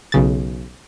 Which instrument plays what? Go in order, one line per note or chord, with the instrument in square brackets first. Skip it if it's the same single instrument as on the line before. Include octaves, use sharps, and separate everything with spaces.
[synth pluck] B1 C#3 A6